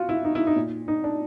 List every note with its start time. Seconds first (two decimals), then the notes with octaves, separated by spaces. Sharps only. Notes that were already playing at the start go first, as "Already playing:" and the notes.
Already playing: F4 F#4
0.09 E4
0.25 D#4
0.35 E4
0.47 D#4
0.56 A#2
0.88 D#4
1.04 D4